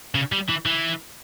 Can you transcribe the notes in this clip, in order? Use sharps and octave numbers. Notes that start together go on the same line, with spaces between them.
C#3
G3
E3
E3